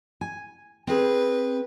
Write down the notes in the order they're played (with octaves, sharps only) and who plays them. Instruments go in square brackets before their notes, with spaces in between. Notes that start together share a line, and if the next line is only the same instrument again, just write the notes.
[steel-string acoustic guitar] G#5
[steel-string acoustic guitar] C4 G#4 [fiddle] B4